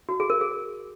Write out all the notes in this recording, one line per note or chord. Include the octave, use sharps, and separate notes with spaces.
F#4
G#4
A#4
G#4